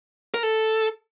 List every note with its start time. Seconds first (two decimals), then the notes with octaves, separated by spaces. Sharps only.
0.34 A#4
0.43 A4